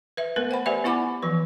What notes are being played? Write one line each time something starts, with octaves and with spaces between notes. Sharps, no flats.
B4 E5
A3 B3 A#4 B4
C5 F#5 G5 B5
G4 B4 C5 D5 E5 G#5
B3 E4 F#5 B5 D6
E3 F3 B4